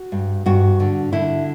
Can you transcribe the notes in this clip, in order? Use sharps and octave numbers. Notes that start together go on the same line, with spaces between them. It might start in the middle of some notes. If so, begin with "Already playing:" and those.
Already playing: F#4
G2
G2 F#4
D3
D3 E4